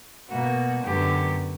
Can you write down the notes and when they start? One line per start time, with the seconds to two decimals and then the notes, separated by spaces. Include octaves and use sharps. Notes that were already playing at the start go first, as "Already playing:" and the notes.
0.30 B2 A#3 F#4
0.84 F#2 D3 F#3 B3 G4